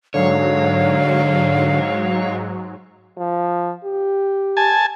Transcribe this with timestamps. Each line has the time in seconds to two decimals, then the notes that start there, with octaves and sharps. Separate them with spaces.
0.14 G#2 D3 F#3 C#5 F5
3.17 F3
3.84 G4
4.57 G#5 A5